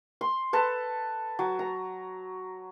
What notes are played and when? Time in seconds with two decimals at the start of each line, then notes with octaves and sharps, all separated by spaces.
0.21 C6
0.53 A4 B4 A5
1.39 F#3
1.59 A#5